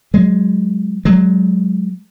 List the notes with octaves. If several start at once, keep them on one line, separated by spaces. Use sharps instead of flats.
F#3 G#3
F#3 G#3